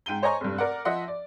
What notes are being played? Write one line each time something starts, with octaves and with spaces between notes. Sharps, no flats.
G#2 G5 D#7 G7
C5 C#5 D#5 G#5 A#5 C#6
F1 G2
A#4 D5 F#5
F3 D#5 E5 F#5 C6
D5